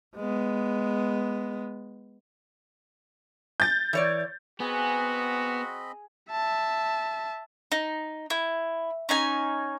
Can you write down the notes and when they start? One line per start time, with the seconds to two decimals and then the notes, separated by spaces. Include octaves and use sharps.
0.16 G#3 B3
3.60 G6 A6
3.93 E3 C#5 D5
4.60 B3 C4 F#4 G#4 D#5 B5
6.31 E5 A5
7.72 D#4
8.30 E4
9.09 C#4 D#4 G#5